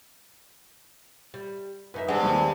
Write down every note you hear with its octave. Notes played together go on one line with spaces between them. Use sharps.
G3
F#2 D#4 B4 E5
G2 G#3 C4 F#5
D#2